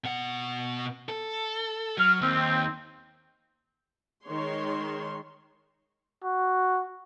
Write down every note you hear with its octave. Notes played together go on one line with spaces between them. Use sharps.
B2 F#5
A4
F#3 F6
D#2 C4
D#3 G#3 C#5 C6
F#4